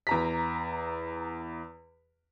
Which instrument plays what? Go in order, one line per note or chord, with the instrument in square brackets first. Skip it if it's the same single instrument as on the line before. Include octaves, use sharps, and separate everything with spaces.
[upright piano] E2 A#5 B6